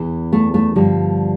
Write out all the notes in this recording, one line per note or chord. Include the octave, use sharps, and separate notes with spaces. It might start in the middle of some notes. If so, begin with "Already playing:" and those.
Already playing: E2 E3
A3
A3
G2 D3 F3 G3